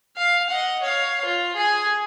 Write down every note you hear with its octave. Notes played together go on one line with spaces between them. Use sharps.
F5
D#5 F#5
C#5 F5
F4
G#4 G#5